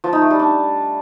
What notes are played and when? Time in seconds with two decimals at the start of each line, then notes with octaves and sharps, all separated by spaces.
0.04 F3
0.13 D#4
0.22 A3
0.30 G3
0.39 D4